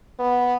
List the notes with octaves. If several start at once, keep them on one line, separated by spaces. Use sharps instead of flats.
B3